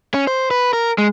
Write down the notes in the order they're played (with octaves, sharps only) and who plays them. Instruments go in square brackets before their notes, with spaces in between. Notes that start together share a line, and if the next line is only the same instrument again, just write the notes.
[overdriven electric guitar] C#4
C5
B4
A#4
G#3